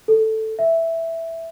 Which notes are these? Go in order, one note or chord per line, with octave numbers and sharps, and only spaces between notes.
A4
E5